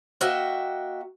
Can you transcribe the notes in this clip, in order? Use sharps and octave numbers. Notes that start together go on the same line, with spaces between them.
A#3 F#4 D#5 E5 G5